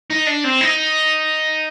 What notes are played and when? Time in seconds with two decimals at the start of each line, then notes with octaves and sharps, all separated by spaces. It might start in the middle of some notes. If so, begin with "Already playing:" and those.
0.10 D#4
0.27 D4
0.44 C4
0.61 D#4